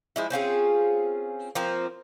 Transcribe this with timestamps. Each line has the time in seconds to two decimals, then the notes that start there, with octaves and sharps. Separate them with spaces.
0.16 F3 G#3 E4
0.30 C4 C#4 F4 G#4
1.55 F3 A#3 C4